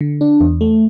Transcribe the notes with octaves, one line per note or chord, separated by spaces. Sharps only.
D3
D4
E2
A3